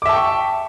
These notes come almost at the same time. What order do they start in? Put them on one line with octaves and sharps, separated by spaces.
D6 E5 A5 G5 C#6